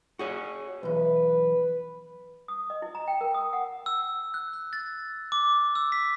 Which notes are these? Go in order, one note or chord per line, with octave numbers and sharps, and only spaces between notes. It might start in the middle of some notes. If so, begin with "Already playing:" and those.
F#4 G#4 C#5
B1 E2 B4
D#6
D#5
E4
A#5
G5
A#4
D#6
F#5
E6
F#6
F#6
A6
D6
E6
B6